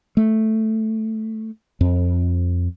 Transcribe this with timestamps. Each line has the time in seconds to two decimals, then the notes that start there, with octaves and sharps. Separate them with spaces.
0.17 A3
1.81 F2